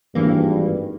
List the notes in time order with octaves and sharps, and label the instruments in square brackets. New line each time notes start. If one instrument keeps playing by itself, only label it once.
[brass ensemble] G#1 G2 [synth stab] E3 A#3